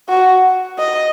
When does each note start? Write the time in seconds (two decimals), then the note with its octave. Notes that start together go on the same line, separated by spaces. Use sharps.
0.09 F#4
0.79 D#5